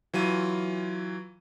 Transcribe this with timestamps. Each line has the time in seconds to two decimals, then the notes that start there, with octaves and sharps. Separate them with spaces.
0.14 E3 F#3 F4 D#7